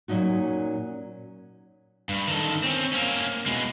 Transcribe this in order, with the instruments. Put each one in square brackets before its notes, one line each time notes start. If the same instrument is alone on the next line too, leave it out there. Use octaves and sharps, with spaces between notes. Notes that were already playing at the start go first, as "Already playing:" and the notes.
[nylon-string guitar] A#2 F#3 A3 C#4 D#4 F#4
[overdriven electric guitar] G2
D#3 A4
C4 C#4
A#3 C#4
B2 G#3